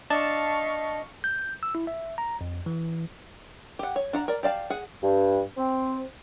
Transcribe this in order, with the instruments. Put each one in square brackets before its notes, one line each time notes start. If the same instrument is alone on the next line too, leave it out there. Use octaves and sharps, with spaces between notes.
[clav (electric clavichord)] D4 [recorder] D#5 [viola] F5 C#6 [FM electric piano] A5
[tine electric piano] G6
E6
E4
E5
A#5
F2
E3
[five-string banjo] G4 F#5
C#5
D4 F#5 A#5
A#4 D5
G4 D5 F5 A5
G#4 F#5
[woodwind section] G2
C4